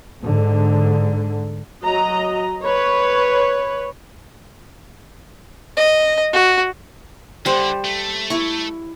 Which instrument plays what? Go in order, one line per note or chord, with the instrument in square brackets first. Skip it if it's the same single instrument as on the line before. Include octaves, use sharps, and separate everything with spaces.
[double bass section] G#2 D3
[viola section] F#3 D#5 A#5
B4 C#5
[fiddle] D#5
F#4
[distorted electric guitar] D3 [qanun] G3 C5
[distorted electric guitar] A3
[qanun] E4 C#6